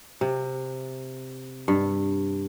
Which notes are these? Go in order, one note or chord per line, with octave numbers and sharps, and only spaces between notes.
C3
G2